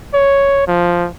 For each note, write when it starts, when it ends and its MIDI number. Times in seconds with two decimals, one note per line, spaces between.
0.14 0.63 73
0.67 1.08 53